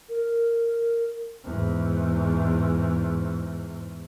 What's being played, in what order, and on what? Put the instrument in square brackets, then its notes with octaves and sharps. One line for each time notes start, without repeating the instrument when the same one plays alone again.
[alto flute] A#4
[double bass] E2 G#2